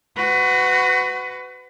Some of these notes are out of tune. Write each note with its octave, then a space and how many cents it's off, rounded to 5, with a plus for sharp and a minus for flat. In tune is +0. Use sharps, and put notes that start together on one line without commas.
F#4 +0 B4 +30